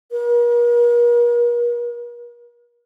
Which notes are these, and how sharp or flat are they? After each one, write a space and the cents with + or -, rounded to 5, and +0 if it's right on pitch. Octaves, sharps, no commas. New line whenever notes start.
A#4 +45